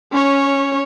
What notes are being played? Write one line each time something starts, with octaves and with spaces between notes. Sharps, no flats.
C#4 C#5